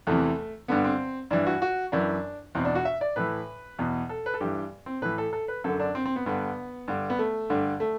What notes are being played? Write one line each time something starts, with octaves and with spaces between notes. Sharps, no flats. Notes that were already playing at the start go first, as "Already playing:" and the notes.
E2 C3 E3 A3
G2 D3 B3
C4
G2 E3 D4
F#4
F#4
F#2 E3 D4
E2 B2 C4
D4
F#4
E5
D5
A2 E3 B4
E2 B2
A4
B4
A4
G2 E3 G4
C4
A2 E3 B4
A4
A4
B4
F#2 D3 A4
D4
C4
C4
B3
G2 D3 B3
G2 D3
B3
A3
G2 D3
A3